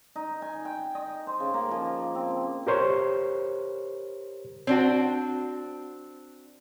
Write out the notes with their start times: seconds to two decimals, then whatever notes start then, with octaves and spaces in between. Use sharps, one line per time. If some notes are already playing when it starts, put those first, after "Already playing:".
0.16 D#4
0.42 G#5
0.65 G5
0.95 D#5
1.27 C5
1.40 C#3
1.54 A#3
1.71 F3
2.15 C4
2.67 G4 A#4 C5 C#5
4.67 C4 D4 F#4